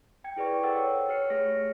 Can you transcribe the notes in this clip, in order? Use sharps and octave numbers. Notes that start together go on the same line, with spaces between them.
G5 G#6 C#7
E4 G#4 B4 D5 C#6
A4 C5 F#5 G5 E6 A6
C#5
G4 C#5 F6 C7 C#7
A3 G#4 C#5 F6 A#6